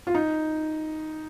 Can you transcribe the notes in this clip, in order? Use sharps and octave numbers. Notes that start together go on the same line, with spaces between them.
F4
D#4